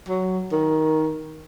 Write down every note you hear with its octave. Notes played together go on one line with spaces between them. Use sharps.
F#3
D#3